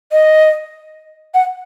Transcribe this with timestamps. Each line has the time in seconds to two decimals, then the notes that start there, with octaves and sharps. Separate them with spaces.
0.12 D#5
1.34 F#5